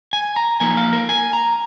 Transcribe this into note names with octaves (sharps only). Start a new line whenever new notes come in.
G#5
A#5
F3 A#3 D#4 G#5
F5
A#4
G#5
A#5